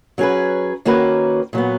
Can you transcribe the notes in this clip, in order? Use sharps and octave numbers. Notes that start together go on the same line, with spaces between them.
F#3 C#4 G#4 B4
D#3 A#3 C#4 F#4 B4
A#2 F#3 B3